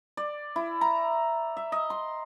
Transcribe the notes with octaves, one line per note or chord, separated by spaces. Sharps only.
D5
E4
A#5
E5
D#5
C6